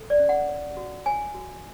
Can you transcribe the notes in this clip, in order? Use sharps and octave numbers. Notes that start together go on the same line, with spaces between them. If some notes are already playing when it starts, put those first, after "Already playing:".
Already playing: A4
D5
C#4
F#5
C#5
F#4
C#5 G#5
F#4